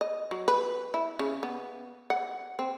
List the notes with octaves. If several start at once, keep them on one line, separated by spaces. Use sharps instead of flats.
D#5
F#3
B4
E4
C#3
B3
F#5
C4